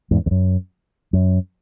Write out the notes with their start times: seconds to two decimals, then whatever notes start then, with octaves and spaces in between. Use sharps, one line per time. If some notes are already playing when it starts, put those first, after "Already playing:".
0.11 E2 G#2
0.26 E2
0.31 F#2
1.13 F#2